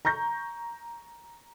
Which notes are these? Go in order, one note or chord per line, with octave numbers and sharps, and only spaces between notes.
A#5 C#6 G6 A#6